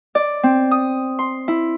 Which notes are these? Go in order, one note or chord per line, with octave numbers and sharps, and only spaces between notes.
D5
C4
D#6
C6
E4